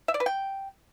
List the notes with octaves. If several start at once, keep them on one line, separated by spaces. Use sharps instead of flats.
E5
D5
B4
G5